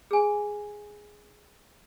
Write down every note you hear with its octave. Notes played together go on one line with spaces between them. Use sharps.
G#4 G#5